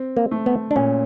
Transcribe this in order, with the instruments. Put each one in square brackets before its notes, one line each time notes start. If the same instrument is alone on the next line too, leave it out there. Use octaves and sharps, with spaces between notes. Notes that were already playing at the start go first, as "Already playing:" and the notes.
Already playing: [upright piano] C4
[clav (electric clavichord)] A#3
[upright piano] A3
[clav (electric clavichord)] B3
D4
[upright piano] A#2 [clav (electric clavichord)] C#4